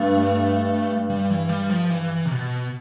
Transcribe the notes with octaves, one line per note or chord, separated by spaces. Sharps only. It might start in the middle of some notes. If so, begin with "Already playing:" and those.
Already playing: G2 A3
G3
E3
G3
F3
E3
C3
B2